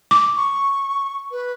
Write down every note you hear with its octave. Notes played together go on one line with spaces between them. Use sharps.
D6
C#6
B4